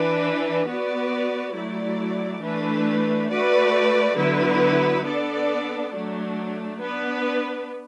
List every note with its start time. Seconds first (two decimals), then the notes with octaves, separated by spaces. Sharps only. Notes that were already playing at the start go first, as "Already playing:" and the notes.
Already playing: E3 D4 B4
0.67 B3 F#4 B4 D5
1.54 F#3 A3 E4 D5
2.42 E3 A3 D4 B4
3.29 A3 F#4 B4 D5
4.16 D3 F#3 B3 E4 B4
5.04 B3 D4 A4 D5
5.92 F#3 A3 D4
6.80 B3 D4 B4